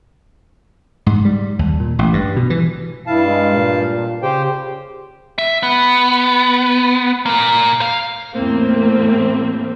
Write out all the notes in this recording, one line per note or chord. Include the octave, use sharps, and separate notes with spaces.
G#2
G3
D#2
A#2
A1
G2
B2
E3
G2 E4 F5 A5
G#3
A#2
C#3 G4 C5 G5
E5
B3
A#2 A#3
F5
E2 A2 A#3 C4